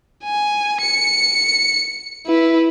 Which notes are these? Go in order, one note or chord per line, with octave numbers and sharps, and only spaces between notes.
G#5
C#7
E4 B4